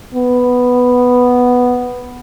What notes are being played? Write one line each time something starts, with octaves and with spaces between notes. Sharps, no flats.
B3